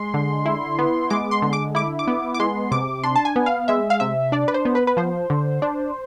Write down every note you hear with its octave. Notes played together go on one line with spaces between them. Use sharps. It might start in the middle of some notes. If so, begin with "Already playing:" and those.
Already playing: G#3 C6
D3
E4
B3
G#3 D6
C6
D3
D6
E4 D6
D6
B3
D6
G#3 C6
C3 D6
D4 C6
A5
G#5
B3
F5
G#3 E5
F5
C3 E5
D4 D5
B4
C5
B3
B4
B4
F3 C5
D3
D4